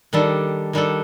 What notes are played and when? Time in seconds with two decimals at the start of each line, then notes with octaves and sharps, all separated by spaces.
0.13 D#3 G3 D4 A4
0.73 D#3 G3 D4 A4